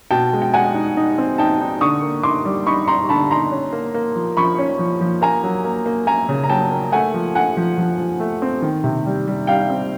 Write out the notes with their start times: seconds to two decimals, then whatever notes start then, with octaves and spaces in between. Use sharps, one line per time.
0.11 B2 G5 A5
0.33 G#3
0.42 G5
0.54 G#3 F#5 G#5
0.74 D#4
0.97 D#4
1.18 C4
1.38 D#4 G5 A5
1.61 D#4
1.81 D3 C#6 D#6
2.02 A#3
2.23 D#4 C6 D6
2.45 G3
2.66 D#4 B5 C#6
2.87 D#4 A#5 C6
3.09 D3 A5 B5
3.30 D#4 A#5 C6
3.51 C#4
3.73 A#3
3.94 A#3
4.15 F3
4.37 F3 B5 C#6
4.58 C#4
4.79 F3
5.01 F3
5.22 A#3 G#5 A#5
5.44 F#3
5.64 A#3
5.86 A#3
6.07 A#3 G#5 A#5
6.29 C#3
6.44 A#5
6.49 F#3 G5 A5
6.71 A#3
6.92 A3 F#5 G#5
7.14 F3
7.35 A3 F#5 G#5
7.57 F3
7.78 F3
7.98 F3
8.20 A3
8.42 C4
8.62 D#3
8.84 C3
9.06 G3
9.27 G3
9.47 G3 F5 G5
9.70 C4